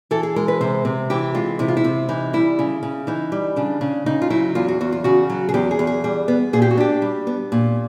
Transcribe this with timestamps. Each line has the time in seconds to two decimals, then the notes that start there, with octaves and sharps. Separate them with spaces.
0.11 E3 A4
0.23 G#4
0.36 G#3 A#4
0.48 B4
0.61 C3 C5
0.85 C3
1.10 E3 G4
1.35 G#3 F4
1.59 C3 E4
1.68 F4
1.77 E4
1.84 C3
2.09 E3 D#4
2.33 G3 E4
2.59 C#3
2.83 C#3
3.07 E3 D#4
3.32 G3
3.56 C#3 D4
3.81 C#3
4.06 C#3 D#4
4.22 F4
4.30 F#3 E4
4.55 E2 F4
4.68 F#4
4.81 E2 F#4
4.92 F4
5.04 C#3 F#4
5.30 F#3
5.49 G#4
5.54 E2 G4
5.71 G#4
5.79 E2
5.87 G#4
6.04 G3 G#4
6.28 B3
6.53 A#2 G#4
6.62 G4
6.71 F#4
6.77 D4 G4
7.02 G3
7.27 B3
7.52 A#2